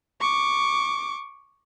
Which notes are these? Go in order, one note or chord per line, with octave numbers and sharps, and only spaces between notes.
C#6 D6